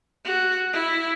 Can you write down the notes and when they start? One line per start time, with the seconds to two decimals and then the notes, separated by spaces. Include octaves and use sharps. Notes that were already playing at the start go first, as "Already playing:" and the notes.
0.25 F#4
0.73 E4